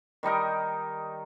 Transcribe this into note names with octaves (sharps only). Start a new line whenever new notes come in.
D#3 G3 D#4 A#4